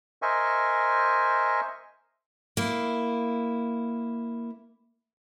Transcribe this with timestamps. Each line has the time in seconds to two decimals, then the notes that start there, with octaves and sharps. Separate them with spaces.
0.22 A#4 C5 D#5 E5 G#5 C#6
2.57 A#3 E4